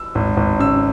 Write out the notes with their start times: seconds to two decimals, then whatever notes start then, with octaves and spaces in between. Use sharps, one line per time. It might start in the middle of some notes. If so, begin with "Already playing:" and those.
Already playing: E6
0.15 G#1
0.37 G#1
0.59 C#3 E6